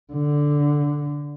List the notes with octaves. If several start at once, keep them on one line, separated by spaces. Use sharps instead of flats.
D3